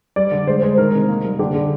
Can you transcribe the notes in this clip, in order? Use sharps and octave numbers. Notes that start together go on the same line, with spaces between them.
G3 D5
D3
G#3 C5
G#3 C5
D#3 A#4
C3
A#3
G3
D3 G4
D3